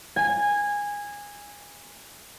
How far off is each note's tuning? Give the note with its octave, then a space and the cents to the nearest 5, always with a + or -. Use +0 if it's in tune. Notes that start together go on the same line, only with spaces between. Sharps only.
G#5 -15